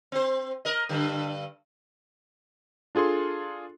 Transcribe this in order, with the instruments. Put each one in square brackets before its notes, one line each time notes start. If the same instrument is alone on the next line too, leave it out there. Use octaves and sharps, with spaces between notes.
[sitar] C4 C5
A#4 D#5
G2 D3
[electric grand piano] D4 F4 G#4 A4 C6